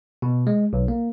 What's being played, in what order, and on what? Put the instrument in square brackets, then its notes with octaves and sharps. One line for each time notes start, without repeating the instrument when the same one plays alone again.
[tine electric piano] B2
G#3
B1
A#3